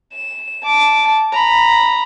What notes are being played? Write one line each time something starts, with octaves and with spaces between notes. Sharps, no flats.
E7
A5 D6
A#5 B5